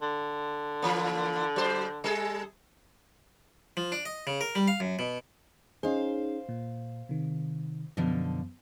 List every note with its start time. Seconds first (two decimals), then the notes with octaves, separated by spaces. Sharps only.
0.02 D3
0.82 E3 A#3
1.56 F#3 C5
2.04 G3 G#4 A4
3.77 F3
3.92 D4
4.05 D#5
4.27 C#3
4.41 A#4
4.55 G3
4.68 F5
4.80 F#2
4.99 B2
5.83 C#4 D#4 G#4 C5 F5
6.49 A#2
7.09 C3 D#3
7.97 F#2 B2 D3 F3